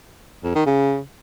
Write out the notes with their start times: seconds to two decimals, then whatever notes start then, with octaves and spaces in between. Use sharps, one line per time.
0.44 F2
0.55 D#3
0.66 C#3